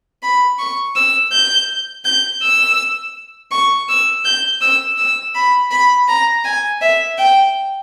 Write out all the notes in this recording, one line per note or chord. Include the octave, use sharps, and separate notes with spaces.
B5
C#6
E6
G6
G6
E6
C#6
E6
G6
E6
E6
B5
B5
A#5
G#5
E5
G5